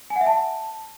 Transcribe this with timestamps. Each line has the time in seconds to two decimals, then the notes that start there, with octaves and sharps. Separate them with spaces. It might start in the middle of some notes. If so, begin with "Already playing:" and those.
0.10 G#5
0.16 F#5
0.21 E5
0.26 A5